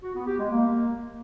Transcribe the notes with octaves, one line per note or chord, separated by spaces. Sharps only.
F#4
B3
G4
G#3
A#3